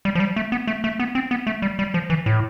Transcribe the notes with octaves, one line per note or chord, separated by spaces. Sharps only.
G3
F3
G3
A3
B3
A3
A3
B3
C4
B3
A3
G3
G3
F3
E3
A2